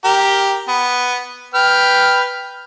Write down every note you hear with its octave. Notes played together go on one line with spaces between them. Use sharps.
G4 A#4
B3
B4 G5 F6